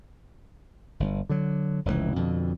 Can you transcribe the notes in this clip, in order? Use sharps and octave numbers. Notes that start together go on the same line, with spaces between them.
G1
D3 F#3
F1 C#2 A#2 E3
F2 B2 D3